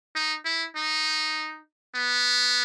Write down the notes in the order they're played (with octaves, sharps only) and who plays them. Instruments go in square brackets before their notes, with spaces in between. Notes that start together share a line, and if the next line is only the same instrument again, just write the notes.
[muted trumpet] D#4
E4
D#4
B3